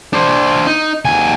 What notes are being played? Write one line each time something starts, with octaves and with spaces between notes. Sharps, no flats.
D4 C5
D#4
D#2 G#5